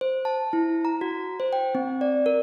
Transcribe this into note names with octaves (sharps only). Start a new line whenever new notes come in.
C5
A5
E4
A#5
F#4
C5
G5
C4
D5
A#4